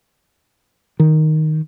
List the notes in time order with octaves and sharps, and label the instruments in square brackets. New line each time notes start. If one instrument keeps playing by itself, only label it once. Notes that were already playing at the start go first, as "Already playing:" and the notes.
[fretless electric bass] D#3